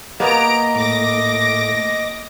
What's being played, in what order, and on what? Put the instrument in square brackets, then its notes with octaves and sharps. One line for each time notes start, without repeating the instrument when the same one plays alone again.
[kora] A#3 B3 [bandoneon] D#5 [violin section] A#5 D7
[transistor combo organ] A2 [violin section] D6 A#6